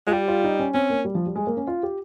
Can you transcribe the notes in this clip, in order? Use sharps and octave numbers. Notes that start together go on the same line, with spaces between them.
G#3 F4
G3 G4
F4
D#4
C#4
C4 C#4
A#3
G3
F3
G3
G#3
A#3
C#4
F4
G4